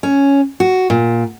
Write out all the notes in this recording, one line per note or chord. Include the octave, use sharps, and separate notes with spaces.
C#4
F#4
A#2